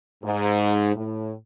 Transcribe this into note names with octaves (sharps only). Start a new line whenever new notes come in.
G#2
A2